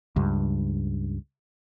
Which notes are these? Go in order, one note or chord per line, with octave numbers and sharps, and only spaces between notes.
C#2 G2